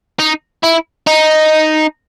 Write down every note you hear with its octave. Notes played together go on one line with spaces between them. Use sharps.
D#4
E4
D#4